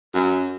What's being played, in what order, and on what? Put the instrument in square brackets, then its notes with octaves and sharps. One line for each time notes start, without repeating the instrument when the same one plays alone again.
[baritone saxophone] F#2